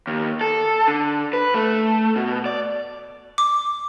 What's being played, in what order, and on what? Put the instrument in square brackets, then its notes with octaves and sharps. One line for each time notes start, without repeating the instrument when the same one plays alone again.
[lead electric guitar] D#2
A4
D3
B4
A3
B2
D5
[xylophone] D6